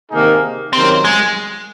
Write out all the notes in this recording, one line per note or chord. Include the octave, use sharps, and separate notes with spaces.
C3 D#3 A#3 D#4 G#4
C3 D#3 F#3 A#3 C4 C#4
G#3